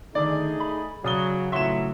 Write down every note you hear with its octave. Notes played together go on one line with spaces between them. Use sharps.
D3 D#3 A3 D4 D#4 G#4 D5
B5
C#3 F#3 D5 D#6 G7
F2 A2 C#3 E3 F#3 E5 C6 E7